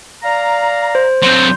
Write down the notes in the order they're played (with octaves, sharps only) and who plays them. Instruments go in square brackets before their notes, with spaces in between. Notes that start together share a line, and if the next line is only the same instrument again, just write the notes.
[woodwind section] D5 F5 A#5
[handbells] C5
[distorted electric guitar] F#3 C4 [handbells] C6 G6